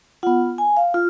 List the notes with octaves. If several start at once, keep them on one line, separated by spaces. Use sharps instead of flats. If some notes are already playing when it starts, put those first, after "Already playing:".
B3 F4 F#5
G#5
F5
F4